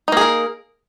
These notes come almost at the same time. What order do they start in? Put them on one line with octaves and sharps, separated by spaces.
D#4 A#3 G#4 A#4